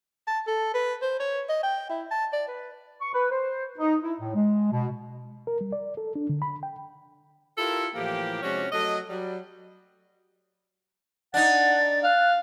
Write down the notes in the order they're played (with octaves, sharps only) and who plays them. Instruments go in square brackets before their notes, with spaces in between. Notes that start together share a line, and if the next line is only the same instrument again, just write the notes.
[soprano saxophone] A5
A4
B4
C5
C#5
D#5
G5
E4
A5
D5
B4
[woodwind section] C#6
B4
C5
D#4
E4
A2
G#3
B2
[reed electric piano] A#4
G3
D5
A4
D4
D3
B5
G5
[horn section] E4 F4 G4 A4 A#4
A2 E3 F3 A#3 G4
C3 F3 G#3 C#4 D4 F#4
F#3 A3 A4 D#5
F#3 G3
[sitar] D4 D#4 [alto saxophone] F#5 [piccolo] A6
[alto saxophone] F5 [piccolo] F#6